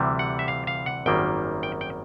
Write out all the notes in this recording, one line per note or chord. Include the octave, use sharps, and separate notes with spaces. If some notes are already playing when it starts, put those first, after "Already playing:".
Already playing: D2 C3 E3 G3
F#5
E5
F5
F5
F#5
G#1 F#2 D#3 G3 A#3 G5
G5
G5